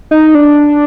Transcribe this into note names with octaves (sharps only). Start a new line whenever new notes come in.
D#4
D4